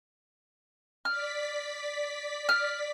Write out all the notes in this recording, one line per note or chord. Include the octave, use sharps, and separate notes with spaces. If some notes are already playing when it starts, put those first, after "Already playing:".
D5 F6 B6
F6